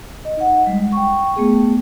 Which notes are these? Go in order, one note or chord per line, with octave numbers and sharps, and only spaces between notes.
D#5
D#4 F#5
G3 G#3
G5 C#6
A3 B3 G#4